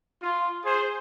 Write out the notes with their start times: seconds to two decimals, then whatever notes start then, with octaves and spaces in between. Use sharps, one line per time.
0.22 F4
0.65 G#4 C5